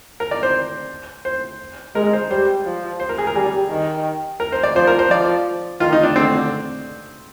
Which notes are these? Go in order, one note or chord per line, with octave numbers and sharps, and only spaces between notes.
A#4
D5
C5
C5
G#3 A#4
C5
G3 C5
F3
C5
A#4
G#4
A#4
G3 G#4
D#3
A#4
C5
D5
F3 C5
A#4
C5
F3 D5
D#3 F4
D#4
D4
D3 C4